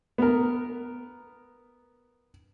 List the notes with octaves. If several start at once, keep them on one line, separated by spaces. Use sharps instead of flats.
B3 A#4